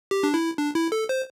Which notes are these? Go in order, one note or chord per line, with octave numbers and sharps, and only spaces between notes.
G4
D4
E4
D4
E4
A4
C5